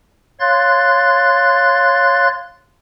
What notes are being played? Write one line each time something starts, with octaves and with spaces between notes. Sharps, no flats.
C#5 F5 C6 F#6 A6